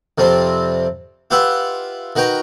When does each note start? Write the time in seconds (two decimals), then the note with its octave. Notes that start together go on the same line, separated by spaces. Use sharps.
0.18 F2 C3 G3 C4
1.31 F4 G4 B4 E5 F#5
2.16 D#3 F#4 B4 G5 A#5